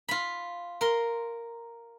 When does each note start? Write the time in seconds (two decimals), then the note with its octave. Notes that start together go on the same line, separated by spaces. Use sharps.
0.09 F4 B5
0.81 A#4 C6